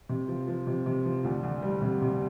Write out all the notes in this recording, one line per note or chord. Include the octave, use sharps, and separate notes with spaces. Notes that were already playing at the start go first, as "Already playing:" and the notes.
C3
F3
F3
C3
C3
F3
D2
D2
G3
C3
C3